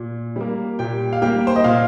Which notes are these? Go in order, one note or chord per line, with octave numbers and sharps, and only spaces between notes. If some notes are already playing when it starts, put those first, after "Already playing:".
Already playing: A#2
G3 A#3
A#2 G4 G5
F5
G3 A#3 G4 G5
C5
D#5
A#2 F4 F5